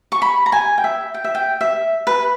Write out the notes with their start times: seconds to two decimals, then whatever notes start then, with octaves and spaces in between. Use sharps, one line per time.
0.12 C#6
0.22 B5
0.46 A#5
0.52 G#5
0.78 G5
0.84 E5
1.14 G5
1.24 E5
1.35 G5
1.61 E5
2.07 B4